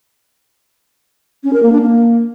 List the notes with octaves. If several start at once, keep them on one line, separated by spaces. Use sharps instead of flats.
C#4
A#4
A#3
D4
A#3